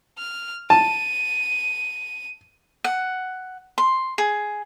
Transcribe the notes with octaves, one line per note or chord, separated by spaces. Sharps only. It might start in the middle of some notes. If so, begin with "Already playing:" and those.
F6
A5 D#7
F#5
C6
G#4